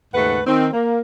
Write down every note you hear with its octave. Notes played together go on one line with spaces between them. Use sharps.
D#2 G#2 C#3 A3 B4 F#5
D#3 C4
A#3